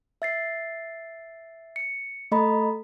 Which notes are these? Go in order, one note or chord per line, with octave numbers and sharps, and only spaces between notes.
E5 A6 C7
C#7
A3 A4 D#5 A#5 B5